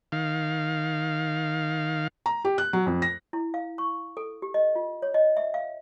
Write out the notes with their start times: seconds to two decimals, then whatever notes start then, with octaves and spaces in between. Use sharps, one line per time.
0.12 D#3 F5
2.26 A#5
2.45 G4
2.58 F#6
2.73 F#3
2.86 F2
3.02 A#6
3.33 E4
3.54 F5
3.78 C#6
4.17 A4
4.42 G4
4.54 D#5
4.76 F4
5.02 C#5
5.14 D#5
5.37 E5
5.54 F5